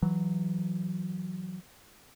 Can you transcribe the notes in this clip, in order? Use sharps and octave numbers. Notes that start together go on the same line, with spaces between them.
E3 F#3